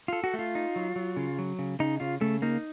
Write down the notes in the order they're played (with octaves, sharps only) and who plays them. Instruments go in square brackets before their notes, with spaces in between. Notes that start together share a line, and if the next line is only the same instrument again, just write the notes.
[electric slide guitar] F4 [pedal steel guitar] A4
[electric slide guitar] F#4
[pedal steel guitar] A3
[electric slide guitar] F4
[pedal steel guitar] D#4
F#3
F#3
C#3
F#3
C#3
[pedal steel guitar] C#3 [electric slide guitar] D#4
[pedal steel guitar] C#3 [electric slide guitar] F4
[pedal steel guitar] C#3 [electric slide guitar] A3
[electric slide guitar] A#3 [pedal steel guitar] D#4